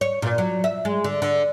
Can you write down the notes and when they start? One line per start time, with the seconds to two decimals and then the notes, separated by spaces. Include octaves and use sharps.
0.01 C#5
0.22 A#2
0.38 F#3
0.64 E5
0.85 G#3
1.04 D3
1.22 D3